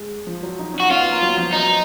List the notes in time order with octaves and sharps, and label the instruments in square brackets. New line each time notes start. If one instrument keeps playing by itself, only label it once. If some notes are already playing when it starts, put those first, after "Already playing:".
Already playing: [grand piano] G#3
F3
F#3
D#4
C#4
[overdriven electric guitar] F#4
[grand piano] C#4 [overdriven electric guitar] F4
[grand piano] B3
A#3
F#3
F3
[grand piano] F#3 [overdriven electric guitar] D#4